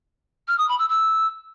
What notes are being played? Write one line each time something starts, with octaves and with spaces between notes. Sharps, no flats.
F6
D#6
B5
E6
E6